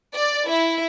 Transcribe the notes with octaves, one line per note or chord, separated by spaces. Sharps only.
D5
E4